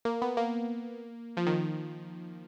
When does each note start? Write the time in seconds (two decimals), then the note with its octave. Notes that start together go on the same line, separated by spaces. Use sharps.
0.05 A#3
0.22 B3
0.37 A#3
1.37 F3
1.47 D#3